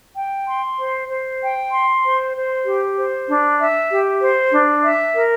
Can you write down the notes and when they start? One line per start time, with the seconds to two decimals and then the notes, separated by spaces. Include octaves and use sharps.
0.16 G5
0.47 C6
0.78 C5
1.10 C5
1.41 G5
1.71 C6
2.03 C5
2.34 C5
2.64 G4
2.96 C5
3.27 D4
3.59 E5
3.90 G4
4.21 C5
4.51 D4
4.82 E5
5.14 A#4